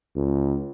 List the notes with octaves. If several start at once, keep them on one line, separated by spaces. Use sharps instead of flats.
C#2